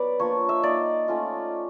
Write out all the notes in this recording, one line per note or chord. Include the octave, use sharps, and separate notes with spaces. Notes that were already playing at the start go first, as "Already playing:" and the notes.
Already playing: F#3 B3 B4 D5
F3 A#3 D4 F4 C#5
E5
A#3 D#4 D5
A3 C#4 F4